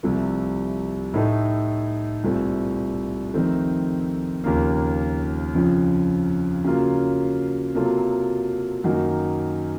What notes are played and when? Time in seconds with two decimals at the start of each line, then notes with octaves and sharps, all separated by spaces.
0.03 C2 C3 F3 A3
1.14 A2 A3 D#4 A4
2.24 C2 A#2 A3 C4
3.34 F2 D#3 A3 C4
4.44 D#2 C#3 F3 A#3
5.55 F2 C#3 F3
6.64 C#3 F#3 A#3 F4
7.75 C3 F#3 A#3 F4 A4
8.84 F#2 D#3 A#3 D#4 F#4